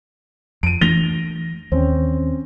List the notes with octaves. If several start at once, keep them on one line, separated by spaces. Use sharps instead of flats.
F2 D7 D#7
E3 A3 D4 A#6 F7 G7
D#2 C4 C#4